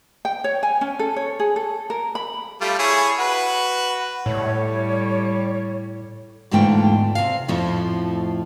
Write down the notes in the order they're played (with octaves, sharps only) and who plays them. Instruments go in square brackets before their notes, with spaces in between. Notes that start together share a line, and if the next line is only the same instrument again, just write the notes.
[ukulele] G5
C#5
G#5
C#4
A4
C#5
G#4
A4
A#4
B5
[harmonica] G3 A3 F4
E4 G#4 C#5
F#4 B4
[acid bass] A2 [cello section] G3 [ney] C#5
[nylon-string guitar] E2 G#2 D3 A3 F4 G5
C3 F5
F2 A2 F3 A3